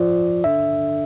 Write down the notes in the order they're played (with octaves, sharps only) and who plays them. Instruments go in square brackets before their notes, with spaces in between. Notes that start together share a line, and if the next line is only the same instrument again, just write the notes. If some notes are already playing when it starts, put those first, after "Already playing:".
Already playing: [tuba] F3 [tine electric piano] D5
[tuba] D3 [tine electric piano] E5